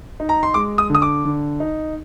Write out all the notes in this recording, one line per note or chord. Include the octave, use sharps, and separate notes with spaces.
D#4
A#5
C6
G#3 D6
D#6
D3 D#6
D6
D3
D#4